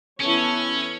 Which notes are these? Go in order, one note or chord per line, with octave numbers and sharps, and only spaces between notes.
E3 B3 C#4 E4 A4 C#5